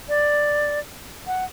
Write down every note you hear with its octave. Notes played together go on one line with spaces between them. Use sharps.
D5
F#5